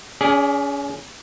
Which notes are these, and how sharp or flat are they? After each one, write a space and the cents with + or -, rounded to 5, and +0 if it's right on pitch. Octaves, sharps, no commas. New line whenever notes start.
C#4 +30 G#4 +0 D5 -10